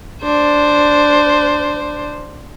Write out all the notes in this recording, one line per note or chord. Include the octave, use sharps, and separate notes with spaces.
D4 C5